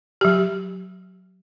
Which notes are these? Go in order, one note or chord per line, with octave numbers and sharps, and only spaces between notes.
F#3 G4